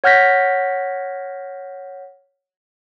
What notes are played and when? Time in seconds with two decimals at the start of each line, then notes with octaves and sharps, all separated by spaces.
0.04 C#5 F#5 F6 G6 A#6 B6